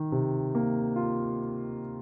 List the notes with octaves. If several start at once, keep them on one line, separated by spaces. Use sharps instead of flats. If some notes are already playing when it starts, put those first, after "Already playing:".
Already playing: D#3
C3
A#3
F4